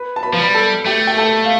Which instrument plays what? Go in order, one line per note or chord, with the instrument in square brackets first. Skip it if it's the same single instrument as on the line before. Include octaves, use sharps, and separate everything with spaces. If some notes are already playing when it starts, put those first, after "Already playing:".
Already playing: [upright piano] B4 B5
A5
B4 B5
[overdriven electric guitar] F3
[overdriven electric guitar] G3 [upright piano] B5
[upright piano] A4 A5
[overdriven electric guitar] A3 [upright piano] G4 G5
[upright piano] G5
A4 A5
F5